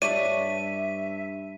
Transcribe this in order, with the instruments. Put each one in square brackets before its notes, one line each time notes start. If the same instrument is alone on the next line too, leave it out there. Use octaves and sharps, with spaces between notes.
[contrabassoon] G2 [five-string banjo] D4 C#5 D5 [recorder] E5 [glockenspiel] D#7